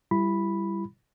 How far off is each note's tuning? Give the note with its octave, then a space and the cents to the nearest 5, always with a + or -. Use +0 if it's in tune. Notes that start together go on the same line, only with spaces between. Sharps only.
G3 +0 E4 +25 B5 +0